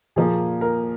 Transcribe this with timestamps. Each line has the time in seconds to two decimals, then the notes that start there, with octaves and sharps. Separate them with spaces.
0.16 A#2 F3 A#3 G#4
0.61 A#4